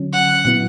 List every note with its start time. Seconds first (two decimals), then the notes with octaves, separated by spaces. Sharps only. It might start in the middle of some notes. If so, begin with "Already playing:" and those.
Already playing: D3 F#3 C#4
0.13 F#5
0.45 A#2 F#3 B3 E4